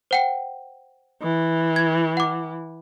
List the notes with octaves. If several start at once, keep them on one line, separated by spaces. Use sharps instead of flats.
C5 F#5 G5
E3
G#6
F#5 D6